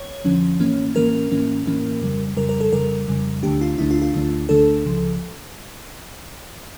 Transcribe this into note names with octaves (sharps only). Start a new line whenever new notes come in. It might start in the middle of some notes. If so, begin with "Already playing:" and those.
Already playing: C#5
F2 D3 F3 C#4
A2 E3 A#3 C#4
A2 E3 A#3 C#4 A#4
A2 E3 A#3 C#4
A2 E3 A#3 C#4
F2 C#3 G3
F2 C#3 G3 A#4
A#4
A4
F2 C#3 G3 A#4
F2 C#3 G3
D2 D3 A3 D4 G4
F4
D2 D3 A3 D4 E4
F4
F4
D2 D3 A3 D4
D2 D3 A3 D4 A4
C#2 C#3 F3